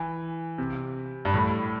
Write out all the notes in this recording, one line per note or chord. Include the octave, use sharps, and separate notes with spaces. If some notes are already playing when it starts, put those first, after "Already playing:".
Already playing: E3
C3
G2
A2